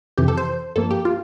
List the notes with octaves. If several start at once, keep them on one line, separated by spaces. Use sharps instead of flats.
F2 C3 E3 G4
A4
C5
G2 F3 A#3 A4
G4
F4